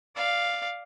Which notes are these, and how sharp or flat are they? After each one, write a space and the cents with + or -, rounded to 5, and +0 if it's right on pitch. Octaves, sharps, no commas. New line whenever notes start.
D5 +5 F5 +0